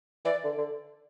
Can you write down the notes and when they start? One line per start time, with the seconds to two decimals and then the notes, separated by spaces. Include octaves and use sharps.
0.25 E3 D5
0.44 D3
0.58 D3